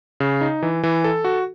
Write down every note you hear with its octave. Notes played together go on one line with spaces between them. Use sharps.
C#3
D#4
E3
E3
A4
F#4